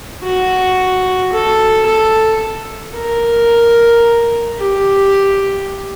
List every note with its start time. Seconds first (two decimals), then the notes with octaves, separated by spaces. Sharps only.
0.23 F#4
1.32 A4
1.86 A4
2.94 A#4
4.59 G4